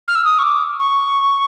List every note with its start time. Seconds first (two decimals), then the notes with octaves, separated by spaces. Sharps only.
0.08 F6
0.15 E6
0.25 D#6
0.38 C#6
0.43 D6
0.79 C#6